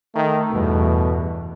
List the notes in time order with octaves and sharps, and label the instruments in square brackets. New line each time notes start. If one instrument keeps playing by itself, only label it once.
[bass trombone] D#3 [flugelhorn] A3
[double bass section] E2 G2 [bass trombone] B2